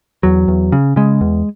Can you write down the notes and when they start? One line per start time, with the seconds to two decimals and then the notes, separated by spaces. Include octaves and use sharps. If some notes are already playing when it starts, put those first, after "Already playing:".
0.23 E2 F#3
0.48 E2
0.72 C#3
0.96 C#3 G#3
1.21 E2